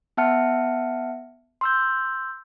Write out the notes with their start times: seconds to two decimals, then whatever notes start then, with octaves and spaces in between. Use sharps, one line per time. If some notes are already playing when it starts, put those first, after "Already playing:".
0.17 B3 E5 F#5 A5 F6 C#7
1.61 C6 E6 G6